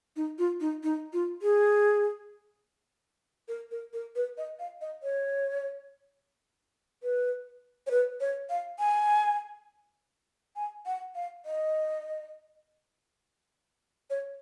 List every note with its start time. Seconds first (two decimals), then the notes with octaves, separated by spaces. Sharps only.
0.16 D#4
0.38 F4
0.60 D#4
0.83 D#4
1.13 F4
1.42 G#4
3.48 A#4
3.71 A#4
3.93 A#4
4.16 B4
4.38 D#5
4.59 F5
4.81 D#5
5.03 C#5
7.03 B4
7.87 C#5
7.91 B4
8.20 C#5
8.50 F5
8.79 G#5
10.56 G#5
10.86 F#5
11.15 F5
11.46 D#5
14.10 C#5